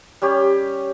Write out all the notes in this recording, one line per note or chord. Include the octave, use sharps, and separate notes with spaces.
G3 C#4 G4